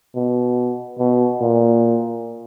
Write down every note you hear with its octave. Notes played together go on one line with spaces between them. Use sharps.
B2
B2
A#2